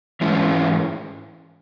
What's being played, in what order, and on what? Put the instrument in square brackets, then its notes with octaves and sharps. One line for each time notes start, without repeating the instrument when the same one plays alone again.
[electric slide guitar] G#2 E3 G#3 C#4 E4